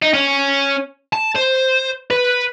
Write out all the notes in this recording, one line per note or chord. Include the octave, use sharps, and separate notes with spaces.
D#4
C#4
A5
C5
B4